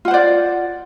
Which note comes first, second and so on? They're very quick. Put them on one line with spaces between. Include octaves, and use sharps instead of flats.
F4 F#5 C5 D5